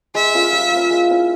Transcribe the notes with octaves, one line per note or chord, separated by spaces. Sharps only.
G#3 E5
C#4 F4 A#4
G3
A#3 C#4
G#3
C#4 E4